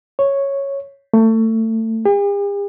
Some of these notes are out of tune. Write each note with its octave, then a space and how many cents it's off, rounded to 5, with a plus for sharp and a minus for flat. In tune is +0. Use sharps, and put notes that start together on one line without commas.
C#5 -5
A3 +25
G4 +45